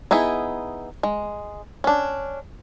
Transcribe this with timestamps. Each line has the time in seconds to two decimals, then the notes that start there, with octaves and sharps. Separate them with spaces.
0.11 B3 D#4 E4 G#4
1.03 G#3
1.84 C#4 D4